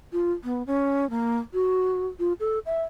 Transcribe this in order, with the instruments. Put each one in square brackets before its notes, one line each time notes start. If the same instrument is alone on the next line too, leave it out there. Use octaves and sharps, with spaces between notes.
[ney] F4
B3
C#4
A#3
F#4
F4
A4
E5